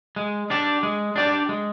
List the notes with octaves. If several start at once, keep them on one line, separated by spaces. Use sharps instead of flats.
G#3
D4 G4 D5
G#3
D4 G4 D5
G#3